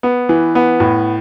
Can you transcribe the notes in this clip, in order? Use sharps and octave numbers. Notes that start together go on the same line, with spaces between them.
B3
E3
B3
A2